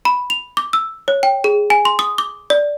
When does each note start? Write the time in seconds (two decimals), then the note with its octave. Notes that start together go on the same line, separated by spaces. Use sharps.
0.05 B5
0.30 F7
0.57 D6
0.73 E6
1.08 C#5
1.23 G5
1.44 G#4
1.70 G#5
1.85 C6
1.99 D#6
2.18 D6
2.50 D5